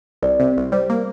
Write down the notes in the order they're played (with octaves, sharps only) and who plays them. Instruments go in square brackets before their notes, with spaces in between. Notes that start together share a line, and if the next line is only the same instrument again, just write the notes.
[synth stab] C2 [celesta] D5
[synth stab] C3
C2
[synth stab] G3 [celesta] C5
[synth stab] A#3